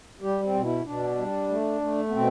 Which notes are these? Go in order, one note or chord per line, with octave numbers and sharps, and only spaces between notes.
G3 G4
C4
B2
E4
B2 D4
G3
A3
A3
B3
B2 C4